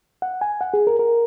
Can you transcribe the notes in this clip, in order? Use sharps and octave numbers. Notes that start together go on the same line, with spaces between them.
F#5
G#5
F#5
G#4
A#4
A#4